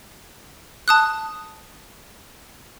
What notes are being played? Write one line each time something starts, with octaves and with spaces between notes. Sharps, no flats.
A5 D#6 F#6